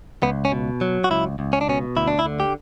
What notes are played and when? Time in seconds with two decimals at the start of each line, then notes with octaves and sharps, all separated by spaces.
0.23 C#2 B3
0.45 C#4
0.52 B2
0.81 F#3
1.04 F#4
1.10 C#2 E4
1.39 C#2
1.53 C#4
1.61 D4
1.68 B2 C#4
1.97 D2 E4
2.08 D4
2.19 E4
2.26 D3
2.40 G4